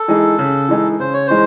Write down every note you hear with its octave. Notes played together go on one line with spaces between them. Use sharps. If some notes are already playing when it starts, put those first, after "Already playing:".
Already playing: A4
E3 G#3 D#4 G#4
C#3
E3 G#3 D#4 G#4
C#3 C5
C#5
E3 G#3 D#4 C5